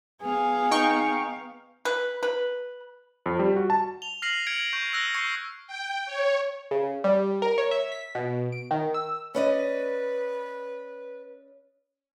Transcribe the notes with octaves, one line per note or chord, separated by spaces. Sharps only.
B3 G#4 F5
D#4 G5 C#6
B4
B4
F2
G3
F#4
A5
F7 G7
F6 A#6 C7 D#7 F#7
F6 G#6 C#7 D7
C#6 G6
E6 F#6 A#6
C#6 G#6 C7 C#7
G5
C#5
C#3
G3
A#4
C#5
E5
B6
B2
D7
D#3
E6
C#4 B4 D5 D#5